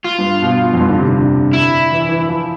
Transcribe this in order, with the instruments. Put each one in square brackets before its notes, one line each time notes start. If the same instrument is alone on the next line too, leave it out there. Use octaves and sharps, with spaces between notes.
[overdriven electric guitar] F4
[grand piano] G2
B2
F2
G2
D3
C3
D3
[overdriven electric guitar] E4
[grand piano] E3
E3
F3